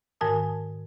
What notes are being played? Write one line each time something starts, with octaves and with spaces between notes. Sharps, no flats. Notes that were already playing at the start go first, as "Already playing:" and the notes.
G#2 D#3 A#4 G#5 A5 D#6